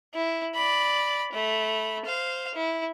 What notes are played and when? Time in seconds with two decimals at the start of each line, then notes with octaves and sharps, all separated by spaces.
0.14 E4
0.55 D5 B5
1.33 A3 B5
2.06 C5 F5
2.54 E4